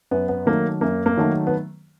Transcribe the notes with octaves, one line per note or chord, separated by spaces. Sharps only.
F#2 B3
B3
D#3 F#3 A3 A#3
F#2 A#3
A#3
D#3 F#3 A3
B3